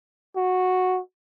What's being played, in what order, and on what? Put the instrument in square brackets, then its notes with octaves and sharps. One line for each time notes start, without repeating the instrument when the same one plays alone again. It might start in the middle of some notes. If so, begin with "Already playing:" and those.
[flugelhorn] F#4